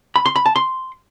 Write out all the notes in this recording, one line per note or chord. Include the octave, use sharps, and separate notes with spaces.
B5
C6
B5
A5
C6